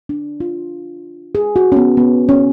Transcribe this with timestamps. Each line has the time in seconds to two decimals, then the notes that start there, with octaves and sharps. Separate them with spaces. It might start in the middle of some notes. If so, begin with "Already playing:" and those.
0.09 D4
0.40 F4
1.35 G#4
1.56 F#4
1.72 C#4
1.76 B3
1.97 B3
2.29 C#4